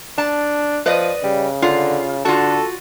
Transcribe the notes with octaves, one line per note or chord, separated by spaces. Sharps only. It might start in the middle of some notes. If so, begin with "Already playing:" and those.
D4 A5
F3 B4 D5 D#5
C#3 G3
D3 F4
D3 F4 F#4 A4